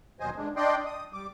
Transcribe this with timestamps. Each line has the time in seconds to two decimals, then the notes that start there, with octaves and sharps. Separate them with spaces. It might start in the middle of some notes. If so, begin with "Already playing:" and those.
0.20 D#2 B2 F#3 C5 D#5 G#5
0.37 G2 G#3 D4
0.56 D4 D5 D#5 G5 C6
0.86 D#6
1.13 G3 D6